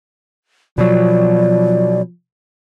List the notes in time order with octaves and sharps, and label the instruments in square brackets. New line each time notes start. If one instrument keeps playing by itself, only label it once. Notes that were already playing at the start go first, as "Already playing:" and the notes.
[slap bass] B2 F#3 [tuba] F3 [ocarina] D5